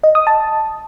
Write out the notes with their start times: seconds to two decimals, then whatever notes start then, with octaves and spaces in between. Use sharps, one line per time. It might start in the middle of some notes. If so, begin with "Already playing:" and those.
0.03 D#5
0.15 D#6
0.27 A5